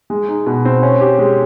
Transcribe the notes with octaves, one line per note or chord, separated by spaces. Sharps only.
G#3
D#4
B2
C4
C#4
G4
G#3